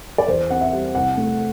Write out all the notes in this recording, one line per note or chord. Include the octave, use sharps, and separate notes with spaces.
D5
E2 C5
C4 F#5
E5
G3
C2 F#5
A3